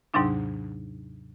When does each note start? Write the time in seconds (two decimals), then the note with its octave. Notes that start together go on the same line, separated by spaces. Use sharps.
0.14 D#2 G#2 C3 F#3 D4 D#4